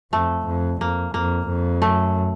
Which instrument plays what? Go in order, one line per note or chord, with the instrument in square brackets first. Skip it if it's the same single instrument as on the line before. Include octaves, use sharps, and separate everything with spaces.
[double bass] F2 [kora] A3
[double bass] F2
[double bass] F2 [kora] A#3
[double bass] F2 [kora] A#3
[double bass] F2
[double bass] F#2 [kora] A3